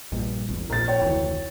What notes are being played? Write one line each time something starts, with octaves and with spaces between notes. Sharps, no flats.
A#1 G2
G#1 E2
A#1 F3 A#4 A6
C#5 G5
F1 D2 D#3 E3